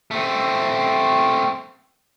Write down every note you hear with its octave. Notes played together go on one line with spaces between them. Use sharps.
A3 C4